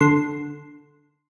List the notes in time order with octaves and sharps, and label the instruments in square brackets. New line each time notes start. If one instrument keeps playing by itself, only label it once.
[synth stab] D3 C6